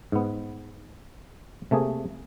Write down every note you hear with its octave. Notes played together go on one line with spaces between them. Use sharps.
G#2 B3
C3 A3 A#3 G#4